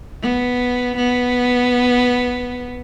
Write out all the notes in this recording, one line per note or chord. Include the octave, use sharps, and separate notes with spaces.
B3
B3